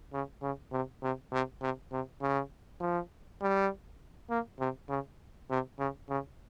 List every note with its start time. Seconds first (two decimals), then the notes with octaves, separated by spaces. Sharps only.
0.13 C#3
0.42 C#3
0.72 C3
1.02 C3
1.32 C3
1.61 C3
1.92 C3
2.21 C#3
2.80 F3
3.41 G3
4.30 A#3
4.59 C3
4.89 C#3
5.50 C3
5.79 C#3
6.09 C#3